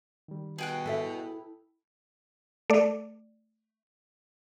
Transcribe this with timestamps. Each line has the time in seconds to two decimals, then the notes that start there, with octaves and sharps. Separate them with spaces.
0.28 D#3 G3
0.58 B2 G#4 G5 F#6
0.86 E4 A4 E5
2.70 A3 D5